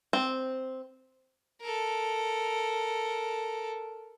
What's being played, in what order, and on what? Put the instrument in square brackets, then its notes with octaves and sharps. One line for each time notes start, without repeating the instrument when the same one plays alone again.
[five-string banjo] C4
[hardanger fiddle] A4 A#4